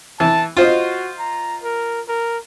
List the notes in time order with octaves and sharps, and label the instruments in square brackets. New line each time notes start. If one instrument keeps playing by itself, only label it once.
[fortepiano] E3 [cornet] A5
[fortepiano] F4 C5 D#5 [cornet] F#4
[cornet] A#5
A#4
A#4